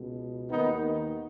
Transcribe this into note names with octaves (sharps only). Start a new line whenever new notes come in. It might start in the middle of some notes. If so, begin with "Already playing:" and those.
Already playing: C#2 B2
D#2 D#3 B3 D#4